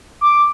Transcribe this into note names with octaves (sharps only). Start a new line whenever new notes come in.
D6